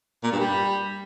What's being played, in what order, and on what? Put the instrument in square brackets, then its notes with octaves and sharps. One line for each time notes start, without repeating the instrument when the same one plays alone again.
[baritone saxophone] A#2
G2
G3